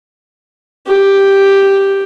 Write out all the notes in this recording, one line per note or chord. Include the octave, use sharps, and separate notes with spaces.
G4